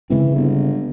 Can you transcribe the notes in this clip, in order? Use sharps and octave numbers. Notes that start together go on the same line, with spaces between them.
C#3 E3 G#3 C4
G1